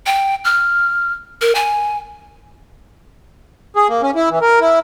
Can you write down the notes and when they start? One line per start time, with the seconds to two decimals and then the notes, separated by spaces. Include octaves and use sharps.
0.06 G5
0.45 F6
1.41 A#4
1.55 G#5
3.76 G#4
3.89 A#3
4.02 C#4
4.16 E4
4.30 E3
4.42 A#4
4.61 E4